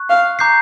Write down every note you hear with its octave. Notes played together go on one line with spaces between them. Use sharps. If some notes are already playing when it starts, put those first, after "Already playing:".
Already playing: C#6 F#6
F5
A#5 D6 G6 C7